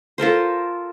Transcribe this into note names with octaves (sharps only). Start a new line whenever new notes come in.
F4 A4 A#4 C5